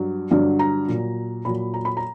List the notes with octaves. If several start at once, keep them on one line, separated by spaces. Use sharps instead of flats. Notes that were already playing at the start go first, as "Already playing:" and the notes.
Already playing: G2 F#3
G2 D3 F#3
A#5
A#2 F#3
A#2 F#3 B5
A#5
B5
A#5